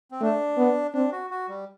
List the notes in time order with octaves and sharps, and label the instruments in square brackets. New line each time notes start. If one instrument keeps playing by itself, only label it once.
[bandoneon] C4
[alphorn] A3 [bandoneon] D4
[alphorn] B3
[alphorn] C4 [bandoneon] D4
[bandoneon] F#4
F#4
G3